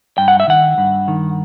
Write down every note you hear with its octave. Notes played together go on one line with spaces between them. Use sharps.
G2 G5
F#5
E5
D#3 F#5
G2
D#3